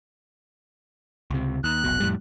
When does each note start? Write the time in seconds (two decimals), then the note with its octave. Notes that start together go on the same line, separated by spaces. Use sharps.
1.31 C#2 C3
1.64 D#2 F#6
1.84 F1 B1 B2
2.00 F2 A2 G3